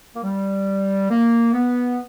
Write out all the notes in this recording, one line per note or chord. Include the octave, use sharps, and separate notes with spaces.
A#3
G3
A#3
B3